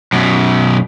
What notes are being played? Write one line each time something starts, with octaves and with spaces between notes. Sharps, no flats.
F#2 B2